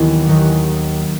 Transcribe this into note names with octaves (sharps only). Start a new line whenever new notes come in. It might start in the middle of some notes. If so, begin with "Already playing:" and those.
Already playing: D#2 D#3 E3 F#3 B3
D#2 D#3 F#3 B3